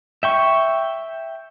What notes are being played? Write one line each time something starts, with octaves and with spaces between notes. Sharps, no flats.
E5 G5 C#6